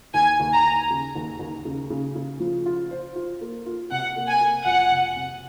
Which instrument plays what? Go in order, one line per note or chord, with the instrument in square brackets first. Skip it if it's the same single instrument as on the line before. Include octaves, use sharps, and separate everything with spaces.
[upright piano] D#2 [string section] G#5
[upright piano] D#2
[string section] A#5
[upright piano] D#2
C#3
D#2
D#2
C#3
C#3
C#3
F3
F4
C5
F4
A#3
F4
[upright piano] C3 [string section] F#5
[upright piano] A#3
[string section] G#5
[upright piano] A#3
[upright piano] F2 [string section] F#5
[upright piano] C3
C3